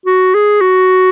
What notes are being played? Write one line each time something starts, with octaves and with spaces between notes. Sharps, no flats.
F#4
G#4
F#4